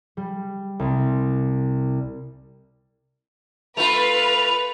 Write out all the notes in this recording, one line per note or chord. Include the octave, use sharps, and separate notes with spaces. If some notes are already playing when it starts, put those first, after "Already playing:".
G3
C2
A3 F4 B4 F7